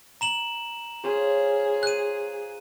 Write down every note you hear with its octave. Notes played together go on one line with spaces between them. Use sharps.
A#5 E7 F#7
C#4 F4 G#4 C5
F#6 D#7